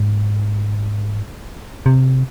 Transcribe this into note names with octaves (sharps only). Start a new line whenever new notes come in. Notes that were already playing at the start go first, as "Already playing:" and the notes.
Already playing: G#2
C3